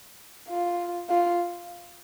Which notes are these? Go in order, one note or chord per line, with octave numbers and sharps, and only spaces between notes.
F4
F4